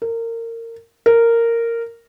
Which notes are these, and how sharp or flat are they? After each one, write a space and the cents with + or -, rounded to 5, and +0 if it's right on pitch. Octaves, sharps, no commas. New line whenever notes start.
A#4 -25
A#4 -10